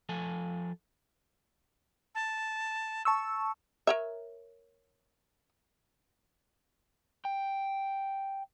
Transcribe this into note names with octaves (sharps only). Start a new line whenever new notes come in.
F3 A4 G#5
A5
A5 C#6 E6
A#4 C#5 E5
G5